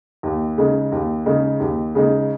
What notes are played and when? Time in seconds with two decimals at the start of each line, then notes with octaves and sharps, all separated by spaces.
0.23 D#2
0.58 C#3 G#3 D#4
0.92 D#2
1.26 C#3 G#3 D#4
1.60 D#2
1.95 C#3 G#3 D#4